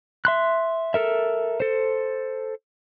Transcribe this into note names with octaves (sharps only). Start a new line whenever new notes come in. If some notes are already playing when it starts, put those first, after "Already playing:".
E5 C6 F#6
A4 A#4 E5
A4 C5